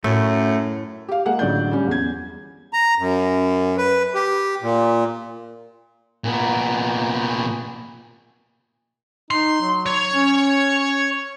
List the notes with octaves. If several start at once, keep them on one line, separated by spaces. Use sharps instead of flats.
F#2 A2 A3
G4 F5
G#3 A#3 F#5
A1 D3 F#3 D5 G6
G3 C#4
E2 G#6
A#5
F#2
B4
G4
A#2
A#2 B3
D#4 C6
F#3
C#5
C#4